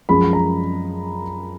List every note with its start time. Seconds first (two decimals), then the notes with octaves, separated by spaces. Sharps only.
0.09 F#2 F3 G#3 B5
0.33 A#5